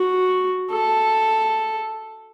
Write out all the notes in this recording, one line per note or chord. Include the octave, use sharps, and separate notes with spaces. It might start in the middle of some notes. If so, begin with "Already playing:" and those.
Already playing: F#4
A4